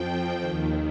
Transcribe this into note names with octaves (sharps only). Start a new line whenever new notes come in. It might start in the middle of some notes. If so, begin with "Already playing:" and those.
Already playing: F2 F3 G5
D#3
D#2